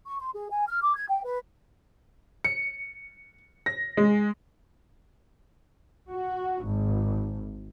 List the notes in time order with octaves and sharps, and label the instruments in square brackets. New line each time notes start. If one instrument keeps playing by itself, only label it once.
[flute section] C#6
C6
G#4
G#5
F6
D6
G#6
G5
B4
[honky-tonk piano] C#7
A#6
G#3
[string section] F#4
G#1